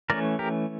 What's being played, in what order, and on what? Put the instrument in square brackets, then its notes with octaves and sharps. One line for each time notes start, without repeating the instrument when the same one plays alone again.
[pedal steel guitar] E3 A3 C#4 A#4 D5
G4 A#4